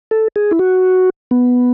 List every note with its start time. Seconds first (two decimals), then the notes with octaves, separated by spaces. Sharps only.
0.11 A4
0.36 G#4
0.51 E4
0.59 F#4
1.31 B3